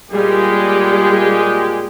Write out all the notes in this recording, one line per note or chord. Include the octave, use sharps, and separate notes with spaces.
A#2 G3 G#3 G4 G#4